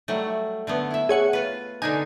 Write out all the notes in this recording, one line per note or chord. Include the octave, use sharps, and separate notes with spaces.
F#3 G3 A3
D3 A3 B3
E4 E5
G#4 C#5 F#5
F4 B4
D3 D4 D#4 G#5